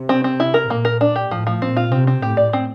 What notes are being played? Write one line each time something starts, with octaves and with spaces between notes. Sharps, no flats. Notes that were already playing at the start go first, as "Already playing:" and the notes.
Already playing: C3
C4
C4
E4
A#4
A#2 A#3
A#4
D4
G4
A2 F3
F3
A#2 C4
F4
C3 C4
C4
A2 G4
D5
C4